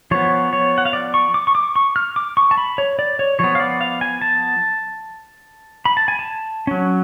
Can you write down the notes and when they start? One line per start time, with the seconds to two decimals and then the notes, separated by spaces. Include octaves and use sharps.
0.11 F3 B3 C#5
0.53 C#5
0.78 F#5
0.85 F5
0.93 D5
1.14 C#6
1.34 D6
1.47 C#6
1.55 D6
1.76 C#6
1.96 F6
2.16 D6
2.37 C#6
2.51 A5
2.58 B5
2.78 C#5
2.99 D5
3.19 C#5
3.39 F3 B3 C#5
3.55 F5
3.60 D5
3.81 F5
4.01 G#5
4.21 A5
5.85 B5
5.97 A5
6.08 G#5
6.19 A5
6.67 F#3 C#4